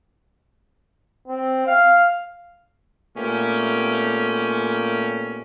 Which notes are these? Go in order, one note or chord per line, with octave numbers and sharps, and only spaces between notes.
C4
F5
A#2 A3 B3 C#4 G4